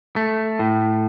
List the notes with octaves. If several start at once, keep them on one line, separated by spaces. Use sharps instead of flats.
A3
A2